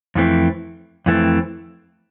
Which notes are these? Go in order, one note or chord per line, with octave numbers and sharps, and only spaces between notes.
F2 E3 A3 C4
F2 E3 A3 C4